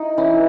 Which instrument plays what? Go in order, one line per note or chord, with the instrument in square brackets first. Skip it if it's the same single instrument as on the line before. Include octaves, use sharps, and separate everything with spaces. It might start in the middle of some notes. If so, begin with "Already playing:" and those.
Already playing: [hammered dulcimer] D#4 [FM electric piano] E4
[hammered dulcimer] E3 [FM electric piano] C#4